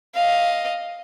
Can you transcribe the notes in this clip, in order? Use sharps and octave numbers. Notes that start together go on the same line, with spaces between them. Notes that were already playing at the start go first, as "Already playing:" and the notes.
D#5 F5